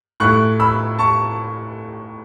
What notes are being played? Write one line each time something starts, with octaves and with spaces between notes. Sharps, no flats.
A2 A3 E4 C#6 F#6
B5 E6
A5 C#6